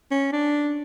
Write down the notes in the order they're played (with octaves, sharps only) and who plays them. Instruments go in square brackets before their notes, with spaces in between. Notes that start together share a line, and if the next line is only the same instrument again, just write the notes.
[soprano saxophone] C#4
D4